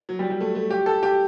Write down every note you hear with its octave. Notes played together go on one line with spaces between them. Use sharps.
F#3
G3
G3
A3
A3
G4
A4
G4